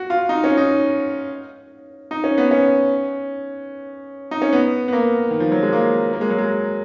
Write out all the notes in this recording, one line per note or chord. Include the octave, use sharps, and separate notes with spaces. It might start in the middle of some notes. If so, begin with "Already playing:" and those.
Already playing: F#4
F4
D#4
C#4
D#4
D#4
C#4
B3
C#4
D#4
C#4
B3
B3
A#3
D#3
F3
F#3
G#3
A#3
A#3
G#3
F#3
G#3